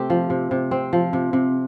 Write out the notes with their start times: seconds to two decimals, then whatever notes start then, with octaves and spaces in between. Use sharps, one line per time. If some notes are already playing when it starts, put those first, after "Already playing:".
Already playing: C3 A3 C4 G4
0.10 F3
0.30 C3
0.51 C3
0.71 C4
0.93 F3
1.13 C3
1.33 C3